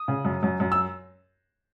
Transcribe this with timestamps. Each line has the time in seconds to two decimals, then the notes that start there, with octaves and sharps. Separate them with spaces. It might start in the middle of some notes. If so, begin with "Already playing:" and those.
Already playing: D#6
0.08 C#3
0.25 F#2
0.43 F#2
0.60 F#2
0.72 E6